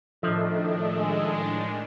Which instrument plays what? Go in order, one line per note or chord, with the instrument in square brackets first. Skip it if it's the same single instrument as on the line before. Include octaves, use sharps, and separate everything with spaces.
[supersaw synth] A2 D#3 D4 [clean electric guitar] F3 [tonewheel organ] A4 D#5 E5
[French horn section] G#3